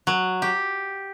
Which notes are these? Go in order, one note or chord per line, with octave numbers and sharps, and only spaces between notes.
F#3
G4